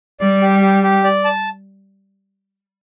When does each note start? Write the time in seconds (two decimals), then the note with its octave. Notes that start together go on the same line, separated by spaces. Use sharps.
0.20 G3 D5
0.42 G4
0.62 G4
0.83 G4
1.04 D5
1.25 A5